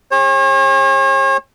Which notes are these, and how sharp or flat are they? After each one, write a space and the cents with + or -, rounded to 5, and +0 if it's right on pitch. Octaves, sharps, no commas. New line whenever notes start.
G#4 -45 C#5 -40